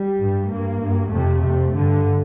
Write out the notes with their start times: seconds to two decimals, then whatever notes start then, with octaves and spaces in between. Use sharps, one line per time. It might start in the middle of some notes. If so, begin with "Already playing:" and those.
Already playing: G3
0.20 G2
0.51 G2 A#3
0.81 G2
1.11 F2 C3 A3
1.42 F2 C3
1.72 G2 D3